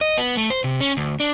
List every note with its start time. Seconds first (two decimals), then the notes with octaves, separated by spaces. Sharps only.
0.01 D#5
0.18 B3
0.37 A3
0.50 C5
0.64 C3
0.81 C#4
0.97 D2
1.20 D4